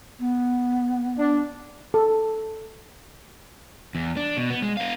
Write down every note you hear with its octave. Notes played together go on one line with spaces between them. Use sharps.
B3
D4
A4
E2
D4
B2
B3
G#3
B3 F5